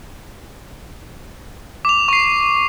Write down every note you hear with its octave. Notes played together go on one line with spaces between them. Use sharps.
D6 F7
C#6 C7